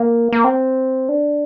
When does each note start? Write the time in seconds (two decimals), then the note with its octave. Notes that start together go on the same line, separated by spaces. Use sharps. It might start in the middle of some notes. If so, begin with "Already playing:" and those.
Already playing: A#3
0.32 A#3
0.44 C4
1.09 D4